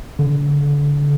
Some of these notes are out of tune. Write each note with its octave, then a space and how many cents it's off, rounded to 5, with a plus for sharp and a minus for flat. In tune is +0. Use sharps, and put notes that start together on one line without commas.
D3 -30